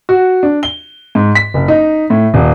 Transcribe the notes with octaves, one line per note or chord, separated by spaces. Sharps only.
F#4
D4
G7
G#2
B6
F#1
D#4
A2
D#1